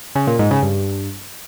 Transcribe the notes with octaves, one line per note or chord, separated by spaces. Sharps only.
C#3
A#2
G#2
C#3
G2